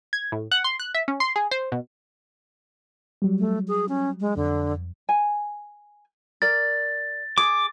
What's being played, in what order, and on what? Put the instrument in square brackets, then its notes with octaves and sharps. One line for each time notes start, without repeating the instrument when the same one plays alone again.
[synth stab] G#6
A2
F#5
C6
F#6
E5
C#4
C6
G#4
C5
B2
[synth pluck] F#3 G3
[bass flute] A3
G#4
C#4
G#3
[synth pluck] F2 [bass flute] D3
[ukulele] G#5
[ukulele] A#4 D5 [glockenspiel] A6
[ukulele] G#4 [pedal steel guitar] D6